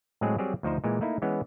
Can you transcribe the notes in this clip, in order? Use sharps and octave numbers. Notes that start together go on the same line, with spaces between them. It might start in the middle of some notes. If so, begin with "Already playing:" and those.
A2 F#3 G#3 C4 G#4
F#3 G3 C4 G4 G#4
D2 F3 D#4 C5
A#2 E3 G#3
A3 A#3 D#4 E4
E3 G#3 B3 C#4